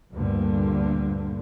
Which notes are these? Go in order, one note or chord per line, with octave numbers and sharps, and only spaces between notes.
D2 G2 A#2 D3